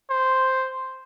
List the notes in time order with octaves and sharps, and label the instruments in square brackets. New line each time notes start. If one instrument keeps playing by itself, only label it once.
[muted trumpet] C5